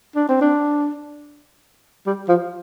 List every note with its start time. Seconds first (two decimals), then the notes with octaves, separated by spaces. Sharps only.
0.15 D4
0.29 C4
0.41 D4
2.06 G3
2.28 F3